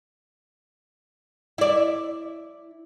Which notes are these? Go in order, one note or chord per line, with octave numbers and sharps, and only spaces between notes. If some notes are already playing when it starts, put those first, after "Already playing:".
E4 D5